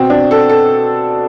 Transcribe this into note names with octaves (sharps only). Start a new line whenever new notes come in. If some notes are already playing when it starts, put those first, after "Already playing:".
Already playing: B2 C4
D4
A4
A4